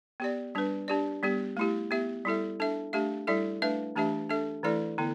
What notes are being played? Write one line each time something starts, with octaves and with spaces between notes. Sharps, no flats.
B3 G4 D5
G3 D4 B4
D4 G4 D5
G3 B3 G4
A3 E4 G4
B3 G4 E5
G3 E4 A4 E5
D4 A4 E5
A3 D4 G4 E5
G3 E4 A4 E5
A3 D4 B4 E5
E3 A3 D4 G4 E5
D4 A4 E5
E3 A3 E4 A4 D5
D3 B3 E4